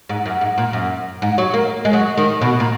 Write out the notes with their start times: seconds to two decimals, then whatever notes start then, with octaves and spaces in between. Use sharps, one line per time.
0.09 G#2
0.26 F#2
0.41 G#2
0.58 A#2
0.73 F#2
1.22 G#2
1.38 F#3
1.54 A#3
1.85 G#3
1.93 F#3
2.18 D#3
2.41 B2
2.60 A#2